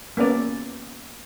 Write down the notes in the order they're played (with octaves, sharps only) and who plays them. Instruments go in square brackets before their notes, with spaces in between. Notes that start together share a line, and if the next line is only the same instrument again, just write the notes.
[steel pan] A#3 B3 C#4 D5